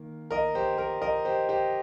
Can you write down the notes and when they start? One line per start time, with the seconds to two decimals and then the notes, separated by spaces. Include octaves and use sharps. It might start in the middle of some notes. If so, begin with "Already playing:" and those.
Already playing: D#3 A#3
0.31 A#4 D#5
0.55 G4 C5
0.78 A#4
1.01 A#4 D#5
1.25 G4 C5
1.49 G4 C5